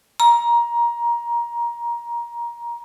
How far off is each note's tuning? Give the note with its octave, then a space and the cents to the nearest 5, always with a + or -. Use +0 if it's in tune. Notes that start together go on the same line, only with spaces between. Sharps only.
A#5 +20